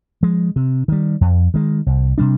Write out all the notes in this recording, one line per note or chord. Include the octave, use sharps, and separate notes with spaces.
F3 G#3
C3
D#3 G3
F2
D#3 G#3
C2
C3 G3 D4